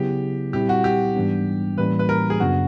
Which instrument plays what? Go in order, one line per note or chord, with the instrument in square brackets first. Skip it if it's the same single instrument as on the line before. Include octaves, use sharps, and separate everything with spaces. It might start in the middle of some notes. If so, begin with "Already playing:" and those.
Already playing: [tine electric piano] C#3 F#3 B3 E4 G#4 [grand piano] G4
[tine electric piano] A#2 G3 C4 E4 [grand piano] G4
[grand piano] F#4
G4
[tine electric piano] G#2 E3 G3 B3 D4
[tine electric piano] A2 E3 G3 A#3 C#4 [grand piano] B4
[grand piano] B4
A#4
G#4
[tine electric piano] F#2 C#3 F#3 B3 D4 [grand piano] F#4